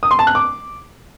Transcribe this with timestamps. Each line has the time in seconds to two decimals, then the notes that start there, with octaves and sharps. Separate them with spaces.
0.03 D#6
0.11 C6
0.19 A5
0.27 F#6
0.35 D6